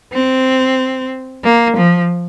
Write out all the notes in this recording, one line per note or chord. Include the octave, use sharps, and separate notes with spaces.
C4
A#3
F3